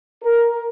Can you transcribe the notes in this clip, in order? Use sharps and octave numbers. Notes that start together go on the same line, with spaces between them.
A#4